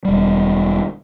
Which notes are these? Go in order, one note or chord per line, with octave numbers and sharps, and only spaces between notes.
E1 G3